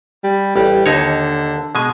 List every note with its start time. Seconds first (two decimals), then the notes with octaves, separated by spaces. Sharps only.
0.23 G3
0.56 A1 G3
0.86 D#2 D3 D#4 C#5
1.75 B2 G#3 G#5